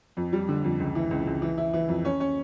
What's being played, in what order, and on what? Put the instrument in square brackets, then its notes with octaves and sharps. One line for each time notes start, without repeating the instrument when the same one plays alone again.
[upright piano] F2
G3
D3
F2
C#2
E3
C#2
C#2
E3
E4
E3
F2
C#4
C#4